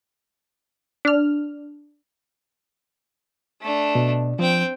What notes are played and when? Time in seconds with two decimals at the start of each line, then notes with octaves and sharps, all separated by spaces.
1.05 D4 F6
3.62 A3 D4
3.95 B2
4.39 F3 C4 G5